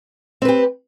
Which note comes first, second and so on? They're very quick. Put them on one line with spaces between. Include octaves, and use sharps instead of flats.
C4 B4 G4